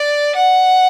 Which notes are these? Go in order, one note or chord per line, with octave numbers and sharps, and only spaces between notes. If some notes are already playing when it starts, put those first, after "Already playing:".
Already playing: D5
F#5